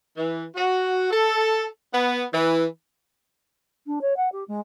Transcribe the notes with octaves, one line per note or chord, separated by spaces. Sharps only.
E3
F#4
A4
B3
E3
D4
C#5
F#5
G4
G#3